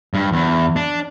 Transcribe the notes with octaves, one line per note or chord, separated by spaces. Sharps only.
G2
E2
D4